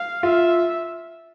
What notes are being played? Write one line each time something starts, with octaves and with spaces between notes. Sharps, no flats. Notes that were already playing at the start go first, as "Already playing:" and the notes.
Already playing: F5
F4 E5